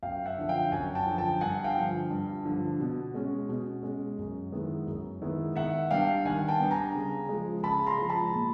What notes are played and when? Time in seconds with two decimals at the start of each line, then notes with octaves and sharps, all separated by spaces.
0.03 F#2 F5 G5
0.26 E5 F#5
0.38 D3 F3
0.49 F5 G5
0.72 F#2 F#5 G#5
0.95 G5 A5
1.06 D3 F3
1.18 G5 A5
1.41 G2 F#5 G#5
1.64 F5 G5
1.76 D3 F3
2.10 G2
2.45 D3 F3
2.80 B2
3.14 G#3 C#4
3.49 B2
3.83 G#3 C#4
4.18 F#2
4.52 D#3 G#3 B3 E4
4.87 F#2
5.21 D#3 G#3 B3 E4
5.56 D#3 E5 F#5
5.91 G3 B3 D4 F5 G5
6.25 D#3 F#5 G#5
6.48 G5 A5
6.60 G3 B3 D4
6.71 G#5 A#5
6.95 C#3
7.29 F3 G#3
7.63 C#3 A5 B5
7.87 A#5 C6
7.98 F3 G#3
8.09 A5 B5
8.33 A#2